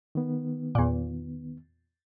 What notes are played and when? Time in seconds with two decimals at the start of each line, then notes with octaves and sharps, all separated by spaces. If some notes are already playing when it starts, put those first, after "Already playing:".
0.15 D#3 B3
0.75 E2 A#2